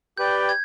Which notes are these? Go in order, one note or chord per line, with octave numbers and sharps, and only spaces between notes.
G4 B4 D5 G5 G6
G#6